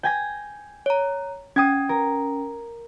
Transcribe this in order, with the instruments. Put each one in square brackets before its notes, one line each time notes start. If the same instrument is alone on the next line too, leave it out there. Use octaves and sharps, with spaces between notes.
[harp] G5 G#5 A#6
[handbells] C#5 A#5
[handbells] C#4 G5 [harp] D#6 G#6
[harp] A#4